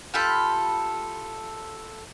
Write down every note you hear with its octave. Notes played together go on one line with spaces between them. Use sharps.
F4 G4 A4 B5